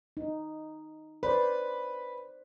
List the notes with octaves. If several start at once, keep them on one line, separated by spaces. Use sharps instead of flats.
D#4
B4 C5 D5